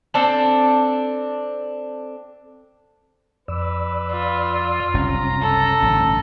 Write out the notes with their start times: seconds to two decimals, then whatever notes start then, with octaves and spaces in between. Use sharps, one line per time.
0.14 C4 D4 A4
3.48 F2 B4 D5 E6
4.11 F4
4.94 F#1 C2 C3 C#4 A#5
5.41 A4
5.82 A1 G2 D3